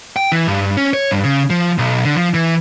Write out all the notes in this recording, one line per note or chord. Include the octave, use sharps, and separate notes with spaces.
G5
E3
G2
C#4
C#5
G2
C#3
F3
B1
D3
F3
E3